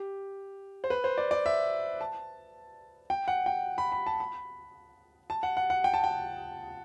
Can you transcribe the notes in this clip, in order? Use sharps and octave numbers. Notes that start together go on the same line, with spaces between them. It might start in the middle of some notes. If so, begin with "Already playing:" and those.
Already playing: G4
C5
B4
C5
D5
D5
E5
A5
G5
F#5
G5
B5
B5
A5
B5
A5
F#5
F#5
F#5
G5
A5
G5